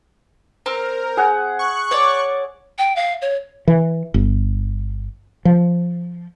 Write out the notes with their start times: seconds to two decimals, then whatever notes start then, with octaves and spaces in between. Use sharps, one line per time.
0.66 C4 A#4
1.17 G#4 F#5
1.59 C#6 F#6
1.91 C#5 D5
2.78 G5
2.96 F5
3.22 C#5
3.68 E3
4.14 G1
5.45 F3